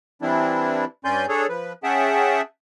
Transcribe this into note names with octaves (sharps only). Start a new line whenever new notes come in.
E3 G3 C4 D4 E4
G2 C#4 D5 G#5 C6 G6
D4 G#4 A4 C#5
F3 B4
C#4 G#4 E5 F#5 G5 A5